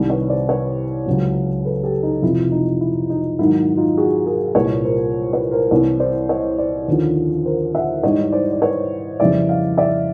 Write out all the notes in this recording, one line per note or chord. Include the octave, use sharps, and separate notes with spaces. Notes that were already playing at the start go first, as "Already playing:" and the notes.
Already playing: C2 C3 D#3 G3
B4 C#5
C5 D5
B4 C#5
C#2 C#3 F#3
A4 B4
G4 A4
D#4
F2 C3 F3 E4
D#4
E4
D#4
G#2 D#3 F#3 E4
D#4 F4
F#4 G#4
G#4 A#4
C2 A#2 G3 B4 C#5
A#4 C5
B4 C#5
A#4 C5
C2 C3 E3 G3 B4 C#5
C5 D5
C#5 D#5
C5 D5
D#2 D3 F3
A#4 C5
E5 F#5
G#2 E3 G3 C#5 D#5
C5 D5
D5
B4 C#5
F2 C#3 E3 G3 D5 E5
D#5 F5
D5 E5